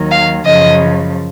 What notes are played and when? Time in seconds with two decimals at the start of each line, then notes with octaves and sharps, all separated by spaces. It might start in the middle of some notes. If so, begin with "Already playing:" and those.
Already playing: D#2 D#3 F#3
0.12 F5
0.45 F#2 C#3 F3 D#5